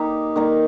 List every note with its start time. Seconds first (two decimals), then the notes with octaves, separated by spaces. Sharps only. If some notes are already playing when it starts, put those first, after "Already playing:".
Already playing: A#3 D#4 G4
0.36 D#3 A#3 D#4